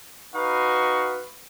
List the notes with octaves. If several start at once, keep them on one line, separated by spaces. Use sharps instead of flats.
D#4 F#4 B4 F5 C#6